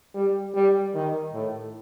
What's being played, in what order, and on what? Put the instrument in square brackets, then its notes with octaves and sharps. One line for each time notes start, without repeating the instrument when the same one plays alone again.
[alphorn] G3
G3
D#3
A2